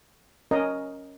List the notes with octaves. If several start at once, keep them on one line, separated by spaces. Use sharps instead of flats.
C#4 A#4 D#5